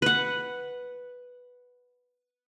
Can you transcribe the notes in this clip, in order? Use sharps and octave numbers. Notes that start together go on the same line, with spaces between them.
B4 F#5